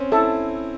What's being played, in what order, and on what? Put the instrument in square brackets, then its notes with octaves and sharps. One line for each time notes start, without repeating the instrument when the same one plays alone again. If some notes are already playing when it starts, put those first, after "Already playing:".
Already playing: [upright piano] C4 C#4
[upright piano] E4 [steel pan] A4